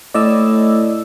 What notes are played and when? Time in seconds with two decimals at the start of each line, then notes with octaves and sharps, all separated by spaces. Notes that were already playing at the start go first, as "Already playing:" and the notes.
0.14 A2 D5 D#5 E6